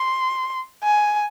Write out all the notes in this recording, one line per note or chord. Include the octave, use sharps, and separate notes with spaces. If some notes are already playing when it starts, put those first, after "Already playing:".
Already playing: C6
G#5